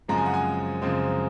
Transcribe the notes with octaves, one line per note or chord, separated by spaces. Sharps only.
F#2 C#3 F3 G#3 C4 A#5
G#5
F#5
G#5
F#2 C#3 F3 G#3 C4